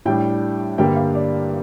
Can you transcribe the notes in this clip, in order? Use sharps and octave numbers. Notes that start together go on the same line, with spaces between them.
A2 G3 D4 G5
G2 D3 G3 A#3 G5
F5
D5